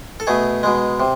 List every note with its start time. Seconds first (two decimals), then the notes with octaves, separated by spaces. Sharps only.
0.20 A4
0.27 B2 A3 G#4
0.63 B2 G#3
1.00 C3